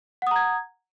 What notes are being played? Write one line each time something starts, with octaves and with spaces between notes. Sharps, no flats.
F#5 A#5 D#6 G#6